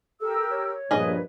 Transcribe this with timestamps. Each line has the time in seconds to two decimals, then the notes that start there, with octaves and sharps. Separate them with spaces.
0.21 G4 A4 A#4 E6
0.50 C#5
0.91 A#1 G2 G#4 B4 D#5